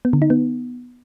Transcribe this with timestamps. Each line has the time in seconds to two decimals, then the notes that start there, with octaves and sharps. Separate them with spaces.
0.05 B3
0.13 D3
0.22 D#4
0.30 B3